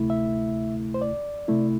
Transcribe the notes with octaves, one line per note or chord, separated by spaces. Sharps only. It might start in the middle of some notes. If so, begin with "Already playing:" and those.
Already playing: D2 C3 A3 E4
E5
C5
D5
C3 A3 E4